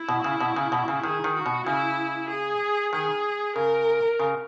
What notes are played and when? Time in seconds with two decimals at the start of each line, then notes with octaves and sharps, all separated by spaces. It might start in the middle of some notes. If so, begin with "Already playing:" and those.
Already playing: E4
0.09 B2
0.24 C#3
0.41 B2
0.56 C#3
0.72 B2
0.88 C#3
1.03 D#3 G#4
1.24 D#3
1.35 F#4
1.46 B2
1.66 C#3 E4
2.29 G#4
2.93 D#3 G#4
3.56 C#3 A#4
4.20 C#3